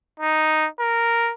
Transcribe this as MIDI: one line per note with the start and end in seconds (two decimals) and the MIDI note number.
0.20 0.68 63
0.80 1.32 70